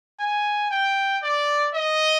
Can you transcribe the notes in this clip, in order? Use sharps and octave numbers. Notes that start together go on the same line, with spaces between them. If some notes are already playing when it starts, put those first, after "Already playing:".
G#5
G5
D5
D#5